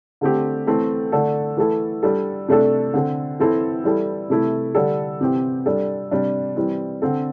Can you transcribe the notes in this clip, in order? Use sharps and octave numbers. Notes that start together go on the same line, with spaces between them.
D3 A3 C4 G4
E3 A3 C4 A4
D3 A3 D4 A4
E3 A3 E4 A4
G3 D4 A4
C3 A3 D4 A4
D3 C4 A4
E3 C4 E4 A4
E3 G3 E4 A4
C3 E3 A3 E4
D3 G3 D4 A4
C3 E3 C4 G4
G3 D4 A4
C3 G3 D4
E3 G3 C4
D3 C4 A4